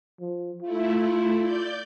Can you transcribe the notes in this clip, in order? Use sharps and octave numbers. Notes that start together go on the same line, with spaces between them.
F3
A3 E4 F4
D5 G6